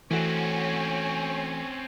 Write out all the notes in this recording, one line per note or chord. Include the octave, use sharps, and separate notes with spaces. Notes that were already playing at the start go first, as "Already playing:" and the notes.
E3 A3 C4 C#4 F#4 C#5 G#5